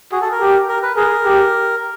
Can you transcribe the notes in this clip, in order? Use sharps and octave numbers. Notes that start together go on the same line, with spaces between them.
F#4 G#4
A4
A#4
G4
A#4
B4
G#4 A#4
G4